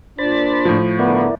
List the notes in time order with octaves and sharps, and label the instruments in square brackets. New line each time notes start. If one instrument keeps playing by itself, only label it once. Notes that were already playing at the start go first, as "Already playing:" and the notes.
[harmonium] A#2 D4 D5 [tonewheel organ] C5 B5 A6
[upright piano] A2 F3
[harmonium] D3 [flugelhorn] B3 [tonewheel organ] E4 A#4 D5